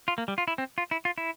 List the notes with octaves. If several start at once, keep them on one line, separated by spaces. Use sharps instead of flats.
F4
A#3
G3
F4
E4
C4
F4
E4
F4
E4